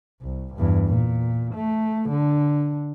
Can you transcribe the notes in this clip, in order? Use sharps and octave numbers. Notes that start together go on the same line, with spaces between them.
C2
E2 G2
A#2
A3
D3